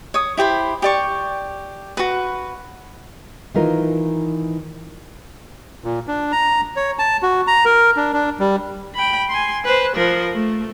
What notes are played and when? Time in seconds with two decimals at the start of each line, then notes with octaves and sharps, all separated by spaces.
0.14 C#5 D#6
0.37 E4 G4 C5 B5
0.82 G4 D5 C#6
1.97 F#4 B4
3.54 D#3 E3 F4 A#4
5.84 A#2
6.08 D4
6.32 A#5
6.76 C#5
6.99 A5
7.23 F#4
7.47 A#5
7.65 A#4
7.97 D4
8.13 D4
8.39 G3
8.95 G5 B5
9.29 G#5 C6
9.65 B4 C5
9.96 F3 A#4
10.34 A3